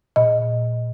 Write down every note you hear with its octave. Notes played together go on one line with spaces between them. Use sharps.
A#2 D#5